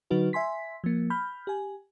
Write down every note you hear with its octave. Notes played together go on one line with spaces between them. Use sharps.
D3 F#3 D#4 F#4 B4
E5 G#5 C6 B6
F3 A#3
B5 F6 G6
G4 G#5